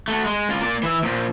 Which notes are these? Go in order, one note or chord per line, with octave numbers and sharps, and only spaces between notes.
A3 F#4
G#3
C#2 F4
A#3 D5
E3 E5
A#2 F3